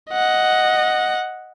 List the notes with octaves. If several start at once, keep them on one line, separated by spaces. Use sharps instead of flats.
D#5 F#5